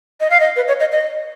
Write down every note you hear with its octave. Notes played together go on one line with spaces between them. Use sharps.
D#5
F5
D#5
B4
C#5
D#5
D#5